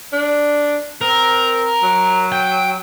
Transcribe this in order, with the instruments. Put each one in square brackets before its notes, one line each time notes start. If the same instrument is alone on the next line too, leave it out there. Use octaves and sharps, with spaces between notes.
[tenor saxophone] D4
[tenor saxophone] C4 [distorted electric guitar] A#4
[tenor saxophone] F#3
[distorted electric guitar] G5